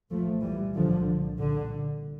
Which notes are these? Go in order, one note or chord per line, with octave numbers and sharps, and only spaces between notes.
C2 A#2 F3 A3
E3 G3
D3 F3
D3